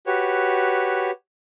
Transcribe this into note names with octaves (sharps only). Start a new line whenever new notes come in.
F#4 G4 B4 C#5